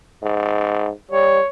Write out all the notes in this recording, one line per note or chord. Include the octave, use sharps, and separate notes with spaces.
G#2
G3 C#5